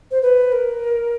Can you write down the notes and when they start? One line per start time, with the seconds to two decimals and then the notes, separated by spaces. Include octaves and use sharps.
0.11 C5
0.22 B4
0.52 A#4